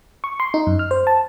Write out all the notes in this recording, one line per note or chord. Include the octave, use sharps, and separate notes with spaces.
C#6
C6
D#4
F#2
F6
C5
A5